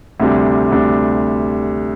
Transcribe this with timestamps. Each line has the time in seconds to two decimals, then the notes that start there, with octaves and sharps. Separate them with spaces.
0.20 D2 C3 G3 D4
0.72 D2 C3 G3 D4